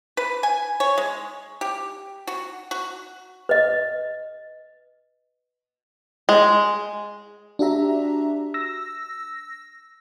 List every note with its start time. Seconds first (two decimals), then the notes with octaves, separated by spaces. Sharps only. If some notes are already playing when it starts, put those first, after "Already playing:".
0.17 B4
0.43 G#5
0.80 C#5
0.98 G#3
1.61 G4
2.27 F#4
2.71 F#4
3.49 B4 D#5
6.29 G#3
7.59 D4 F#4 G4 E5 A#5
8.54 E6 A#6